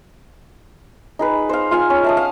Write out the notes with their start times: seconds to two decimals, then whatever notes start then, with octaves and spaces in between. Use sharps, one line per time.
1.19 D#4 G#4 B4
1.49 C5 F5
1.71 F4 F5 G#5
1.90 C#4
2.04 E5 A5 D#6
2.17 F5